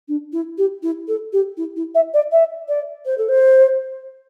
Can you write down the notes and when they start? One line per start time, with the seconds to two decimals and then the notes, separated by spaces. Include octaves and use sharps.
0.08 D4
0.32 E4
0.58 G4
0.83 E4
1.08 A4
1.33 G4
1.57 E4
1.76 E4
1.95 E5
2.14 D5
2.32 E5
2.68 D5
3.06 C5
3.18 A4
3.28 C5